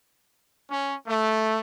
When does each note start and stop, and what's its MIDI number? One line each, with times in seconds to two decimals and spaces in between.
0.70 0.93 61
1.06 1.60 57